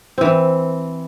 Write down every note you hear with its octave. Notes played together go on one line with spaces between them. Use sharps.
E3 C4